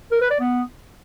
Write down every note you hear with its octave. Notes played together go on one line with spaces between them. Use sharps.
A#4
B4
D5
B3